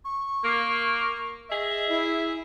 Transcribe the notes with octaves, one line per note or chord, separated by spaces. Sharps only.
C#6
A#3
G#4 D#5 E5
E4